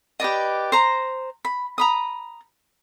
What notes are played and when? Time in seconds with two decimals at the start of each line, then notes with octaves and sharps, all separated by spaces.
0.20 G4 B4 D5 D#5
0.72 C5 A#5
1.45 B5
1.78 A#5 B5 D#6